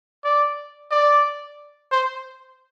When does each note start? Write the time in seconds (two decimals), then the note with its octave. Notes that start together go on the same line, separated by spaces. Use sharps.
0.24 D5
0.91 D5
1.92 C5